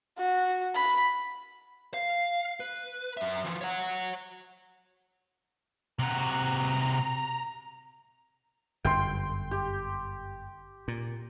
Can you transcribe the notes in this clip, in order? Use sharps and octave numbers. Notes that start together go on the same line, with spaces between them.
F#4
B5
F5
B4
F#2 E5
E3 F3
C#5 F#5
C3 F#4 A#5
G1 F#2 G5 C6
G4
A#2